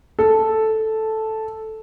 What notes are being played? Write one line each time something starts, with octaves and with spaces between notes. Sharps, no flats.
A4